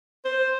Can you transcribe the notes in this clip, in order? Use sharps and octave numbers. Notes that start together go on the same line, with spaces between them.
C5